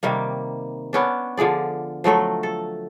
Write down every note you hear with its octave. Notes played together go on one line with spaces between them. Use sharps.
C3 D#3 G3 A#3
B3 C#4 D4
D3 F3 G#4 D5
F3 F#3 A3 A4
A4